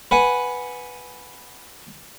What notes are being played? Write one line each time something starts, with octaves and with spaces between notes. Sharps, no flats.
B4 F#5 G#5